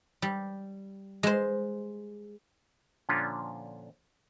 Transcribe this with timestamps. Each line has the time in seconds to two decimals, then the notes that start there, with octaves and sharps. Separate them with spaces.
0.22 G3
1.23 G#3 C5
3.09 A#2 D3 F3 C#4 D4 F4